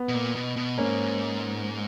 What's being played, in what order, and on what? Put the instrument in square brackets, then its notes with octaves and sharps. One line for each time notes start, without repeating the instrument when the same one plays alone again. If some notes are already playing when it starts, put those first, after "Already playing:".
Already playing: [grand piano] B3
[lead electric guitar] B2
A#2
B2
B2
[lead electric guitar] G#2 [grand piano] A#3 C#4